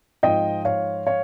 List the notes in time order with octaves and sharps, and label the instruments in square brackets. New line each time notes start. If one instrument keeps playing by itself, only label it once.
[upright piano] G#2 F3 D#5 G5
C#5 F5
C#5 F5